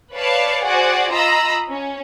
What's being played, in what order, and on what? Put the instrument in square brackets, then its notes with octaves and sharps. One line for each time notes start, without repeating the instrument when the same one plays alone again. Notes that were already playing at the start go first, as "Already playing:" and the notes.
[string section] B4 C#5 D5 F5 A5
F#4 G#4 C5 D5 F#5
F4 D#5 A#5 B5 E6
C#4